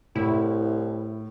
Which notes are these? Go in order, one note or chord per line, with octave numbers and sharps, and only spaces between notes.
C2 A2 E4